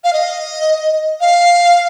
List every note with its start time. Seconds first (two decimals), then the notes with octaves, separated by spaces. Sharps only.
0.04 F5
0.13 D#5
1.21 F5